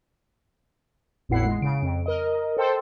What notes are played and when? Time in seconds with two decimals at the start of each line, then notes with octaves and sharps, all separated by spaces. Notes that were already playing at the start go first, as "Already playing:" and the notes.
1.29 G#1 E2 A2 E4 F#5 C7
1.45 G#3
1.62 C#3 D7
1.82 F2
2.06 A#4 D#5
2.57 A4 C5 G5 A5 C6 E6